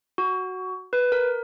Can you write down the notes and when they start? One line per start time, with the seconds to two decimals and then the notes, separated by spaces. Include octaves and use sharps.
0.18 F#4
0.93 B4
1.12 A#4